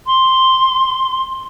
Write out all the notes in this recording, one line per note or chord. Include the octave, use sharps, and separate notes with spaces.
C6